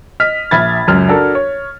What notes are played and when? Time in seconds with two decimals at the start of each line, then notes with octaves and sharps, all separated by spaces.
0.20 D#5 F6 B6
0.51 A#1 E5 B5 G#6 A6
0.87 C#2 F#2 F6
1.08 D4 F#4 A4 A#4
1.35 C#5